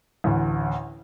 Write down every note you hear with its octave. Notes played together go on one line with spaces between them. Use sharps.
A1 D2